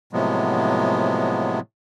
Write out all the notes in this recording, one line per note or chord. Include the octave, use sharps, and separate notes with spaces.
A2 C3 F3 F#3 G#3 B3